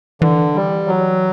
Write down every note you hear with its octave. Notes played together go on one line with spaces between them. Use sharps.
D3 E3
G3
F#3